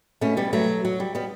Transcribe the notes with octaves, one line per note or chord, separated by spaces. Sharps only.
B2 A3 C#4
G3 B3
F#3 A3
F#3
G3
G3 B3